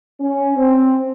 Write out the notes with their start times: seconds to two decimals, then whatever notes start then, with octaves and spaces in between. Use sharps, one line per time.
0.20 C#4
0.57 C4